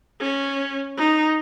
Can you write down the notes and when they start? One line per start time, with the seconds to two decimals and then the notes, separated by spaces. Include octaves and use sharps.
0.20 C#4
0.97 D#4